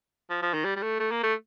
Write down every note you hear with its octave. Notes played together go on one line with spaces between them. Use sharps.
F3
F3
D#3
G3
G3
A3
A3
A#3
A3